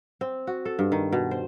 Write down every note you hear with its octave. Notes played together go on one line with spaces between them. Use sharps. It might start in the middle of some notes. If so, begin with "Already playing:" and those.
C4
F#4
A4
G2
D#3
B2
C5